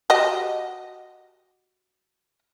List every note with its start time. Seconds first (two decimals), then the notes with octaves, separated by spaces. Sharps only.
0.10 F#4 G4 D#5